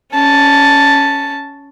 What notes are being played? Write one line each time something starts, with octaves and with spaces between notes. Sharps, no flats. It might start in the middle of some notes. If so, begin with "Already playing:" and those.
C#4 A5